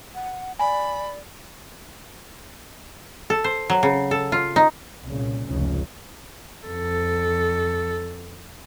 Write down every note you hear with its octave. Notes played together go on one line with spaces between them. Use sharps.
F#5
D5 G#5 B5
A4
C5
F#3
C#3
A4
F4
D#4
C2 A#2 C#3
F1 C#2 G#2 C#3
F2 A4